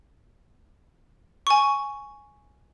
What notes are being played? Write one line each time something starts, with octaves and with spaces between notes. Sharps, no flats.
G#5 C#6